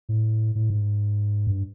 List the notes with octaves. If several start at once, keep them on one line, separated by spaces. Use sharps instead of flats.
A2
A2
G#2
G2